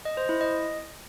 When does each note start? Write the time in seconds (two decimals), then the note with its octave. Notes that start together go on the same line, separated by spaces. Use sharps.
0.05 D#5
0.17 C5
0.29 E4
0.41 D#5